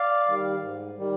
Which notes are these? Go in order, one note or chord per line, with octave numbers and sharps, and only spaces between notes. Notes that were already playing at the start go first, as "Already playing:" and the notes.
Already playing: D5 F5
D#3 G3
G#2
D#3 G3